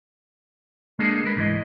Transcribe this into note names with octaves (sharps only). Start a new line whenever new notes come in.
G#3 A#3 D4 D#4 G#4 A4
G#3 A#4 B4
C2 G#2 E3 F#3 G#3 D#5